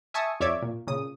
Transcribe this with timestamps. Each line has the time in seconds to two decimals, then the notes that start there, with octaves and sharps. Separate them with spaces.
0.14 E5 G#5 A5 C#6 D#6
0.40 F2 C#5 D5 E5 D6 G#6
0.62 A#2
0.87 A#2 C#3 D#6